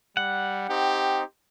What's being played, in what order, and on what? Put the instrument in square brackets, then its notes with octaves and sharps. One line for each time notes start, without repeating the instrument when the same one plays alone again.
[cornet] G3 [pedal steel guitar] F#5
[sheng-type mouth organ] C4 D#4 [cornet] G4